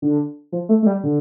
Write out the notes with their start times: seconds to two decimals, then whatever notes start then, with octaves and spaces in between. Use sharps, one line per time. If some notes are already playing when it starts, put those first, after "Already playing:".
0.02 D3
0.52 F3
0.69 A3
0.82 A3
0.86 G3
1.04 D3